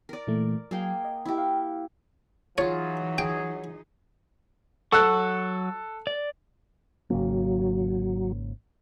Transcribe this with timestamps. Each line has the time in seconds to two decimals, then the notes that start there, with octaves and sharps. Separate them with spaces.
0.09 A#4 D5
0.27 A#2 E3 A3
0.71 F#3 A#3 G#4 G5
1.05 D#5
1.25 E4 G4
1.38 F5
2.58 E3 F#3 D#4 F4 G#4 C#5
3.18 G#4 G5
4.92 F#3 A4 F#5 C#6 E6 F#6
6.07 D5
7.10 G#1 C#3 F#3 A#3